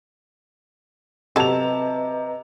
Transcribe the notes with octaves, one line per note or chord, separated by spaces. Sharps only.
C3 F#3 A4 B4 D#5 A5 A#5 F7